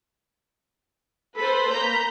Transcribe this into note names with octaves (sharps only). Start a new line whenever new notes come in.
A4 B4 C5 B5
A#3 A#5 G6